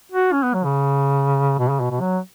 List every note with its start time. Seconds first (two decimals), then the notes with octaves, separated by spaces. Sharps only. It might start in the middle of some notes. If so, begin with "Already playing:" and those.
0.12 F#4
0.33 C#4
0.43 B3
0.54 F#3
0.64 C#3
1.59 B2
1.70 C#3
1.81 B2
1.91 B2
2.01 F#3